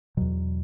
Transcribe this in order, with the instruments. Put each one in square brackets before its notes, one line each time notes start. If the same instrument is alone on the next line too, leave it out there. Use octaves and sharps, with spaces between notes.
[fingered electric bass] E2 B2 F#3